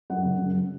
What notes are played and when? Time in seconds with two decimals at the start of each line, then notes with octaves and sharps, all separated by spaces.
0.10 F#2 F#5
0.25 C#3
0.41 F#2